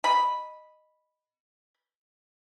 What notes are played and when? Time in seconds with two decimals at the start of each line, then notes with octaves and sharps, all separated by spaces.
0.04 D#5 B5